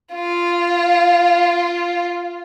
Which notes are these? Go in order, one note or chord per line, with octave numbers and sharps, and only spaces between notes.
F4